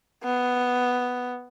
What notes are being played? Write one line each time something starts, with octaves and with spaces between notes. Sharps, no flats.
B3